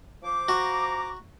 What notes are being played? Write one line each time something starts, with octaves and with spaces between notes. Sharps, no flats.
F3 C5 D6
F#4 A#5